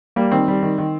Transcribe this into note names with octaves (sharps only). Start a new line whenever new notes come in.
G3 A#3
D#3 C4
G3
D#3
D#3